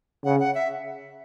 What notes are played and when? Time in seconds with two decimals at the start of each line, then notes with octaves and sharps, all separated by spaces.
0.24 C#3 F#5
0.40 F#5
0.55 E5